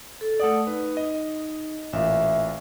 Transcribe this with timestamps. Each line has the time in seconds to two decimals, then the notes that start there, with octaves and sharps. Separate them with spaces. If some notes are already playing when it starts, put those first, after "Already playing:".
0.21 A4
0.40 A3 A4 D5 F#5 D#6
0.67 D#4 B4
0.97 D#5
1.93 A1 A#2 E5 F5